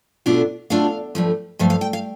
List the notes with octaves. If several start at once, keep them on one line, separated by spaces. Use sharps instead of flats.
B2 A3 D4 F4
B2 A3 D4 F4 F5
G2 F3 A3
G2 F3 A3 F5
F5
G5
F5